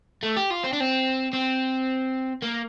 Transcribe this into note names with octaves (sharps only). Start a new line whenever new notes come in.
A3
G4
F4
C4
D4
C4
C4
A#3